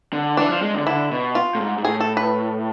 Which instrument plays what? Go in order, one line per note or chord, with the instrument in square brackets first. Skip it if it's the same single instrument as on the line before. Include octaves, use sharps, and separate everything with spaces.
[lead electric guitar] D3
[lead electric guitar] E3 [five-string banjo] D4
[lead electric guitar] F3
G#3
D3
[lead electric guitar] D3 [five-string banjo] E4
[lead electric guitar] B2
[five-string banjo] F4
[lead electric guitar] A2
G#2
G#2
[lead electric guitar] A2 [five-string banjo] G#4
[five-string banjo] A4
B4